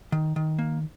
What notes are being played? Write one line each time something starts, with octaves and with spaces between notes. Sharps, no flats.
D#3
D#3
A#3